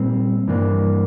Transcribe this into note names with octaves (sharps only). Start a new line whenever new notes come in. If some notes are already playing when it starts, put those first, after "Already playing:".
Already playing: A#2 G3 C4
G2 E3 A#3 D4